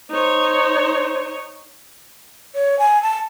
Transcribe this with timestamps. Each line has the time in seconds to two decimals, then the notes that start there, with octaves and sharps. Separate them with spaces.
0.11 D#4 C5 C#5
2.55 C#5
2.79 G#5
3.02 A5